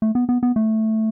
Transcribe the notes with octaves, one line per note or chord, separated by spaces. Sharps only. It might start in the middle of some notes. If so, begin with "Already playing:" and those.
A3
B3
B3
B3
A3